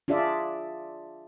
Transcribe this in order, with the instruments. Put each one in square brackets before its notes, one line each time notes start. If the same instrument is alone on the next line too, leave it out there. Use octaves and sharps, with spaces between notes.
[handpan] D4 F4 G#4 D5 E5